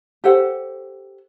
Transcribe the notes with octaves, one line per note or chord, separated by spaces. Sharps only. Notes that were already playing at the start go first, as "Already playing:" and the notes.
G4 A4 C5 F#5